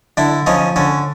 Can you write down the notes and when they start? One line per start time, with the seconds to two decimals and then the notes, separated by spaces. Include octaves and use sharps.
0.17 D3 D4 E4
0.46 F3 C#4 D#4
0.76 D3 C#4